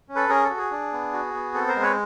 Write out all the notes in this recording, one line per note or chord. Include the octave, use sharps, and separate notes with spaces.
C#4
A4 B4
C#4 G#4 A#4
A4
F#4
G#4
D4
B3
F#4
B3
C4 A4
A#4 C5
G#3
B4 C#5